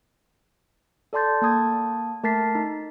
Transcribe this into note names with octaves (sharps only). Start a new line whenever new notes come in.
A4 D5 A5 C6 G6 A6
A#3 A5 D#6 G#6
A3 A#4 A5 A6 B6 C7
D#4